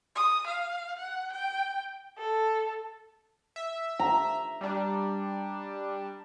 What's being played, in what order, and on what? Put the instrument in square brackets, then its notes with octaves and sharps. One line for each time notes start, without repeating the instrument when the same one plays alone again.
[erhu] D#6
F5
F#5
G5
A4
[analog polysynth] E5
[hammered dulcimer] A#5
[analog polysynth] G3 D4